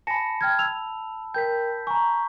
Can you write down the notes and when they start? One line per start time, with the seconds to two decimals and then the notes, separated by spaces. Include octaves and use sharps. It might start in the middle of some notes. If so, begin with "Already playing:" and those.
0.07 G#5 A5 B5 A#6 C#7
0.41 G5 F6 G#6
0.59 E6 F7
1.34 A#4 G5 G6 B6
1.87 G#5 A#5 C#6